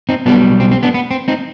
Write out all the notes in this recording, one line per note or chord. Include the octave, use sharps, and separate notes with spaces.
C4 D#4
B1 B2 G3 B3 D4
C4
C4
B3 D4
B3
C4
C4 D#4